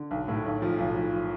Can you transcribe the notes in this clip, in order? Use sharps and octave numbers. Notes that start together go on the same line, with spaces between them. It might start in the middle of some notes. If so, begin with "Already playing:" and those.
Already playing: D3
B1
A2
B1
F3
B1
F3